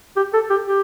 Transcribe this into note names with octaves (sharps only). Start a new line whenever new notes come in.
G4
A4
G4
G4